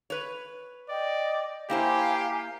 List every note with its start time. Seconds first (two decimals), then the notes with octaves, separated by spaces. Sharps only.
0.10 B4 C#5
0.89 D5 D#5 G5
1.70 A#3 E4 G4 C5 F5 G#5 A#5